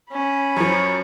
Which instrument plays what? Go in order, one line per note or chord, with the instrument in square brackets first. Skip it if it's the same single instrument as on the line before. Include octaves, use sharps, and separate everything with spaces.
[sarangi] C#4 [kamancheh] B5
[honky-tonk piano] F#2 F3 [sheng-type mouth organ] C#5